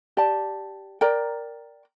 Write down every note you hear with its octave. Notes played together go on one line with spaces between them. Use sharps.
G4 D5 A5
A#4 D5 G5 A#5